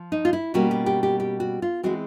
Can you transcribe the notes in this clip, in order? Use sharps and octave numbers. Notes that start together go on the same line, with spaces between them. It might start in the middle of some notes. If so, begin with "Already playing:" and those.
Already playing: F3
D#4
F4
E4
B2 G3 A#3 C#4 F#4
G4
G4
G4
G4
F#4
F4
E3 G#3 C4 F#4